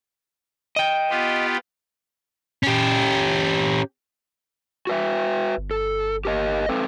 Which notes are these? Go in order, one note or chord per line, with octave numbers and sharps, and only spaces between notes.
D#5 G5
B3 F4 G4
C#4 G4
F#4 B4 E5
G1
A4
G4 A#4 D#5
C4 A4 B4